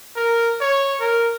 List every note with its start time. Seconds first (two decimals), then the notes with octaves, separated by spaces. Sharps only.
0.16 A#4
0.61 C#5
1.00 A#4